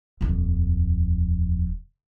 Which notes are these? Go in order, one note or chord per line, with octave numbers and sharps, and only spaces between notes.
D#1 F2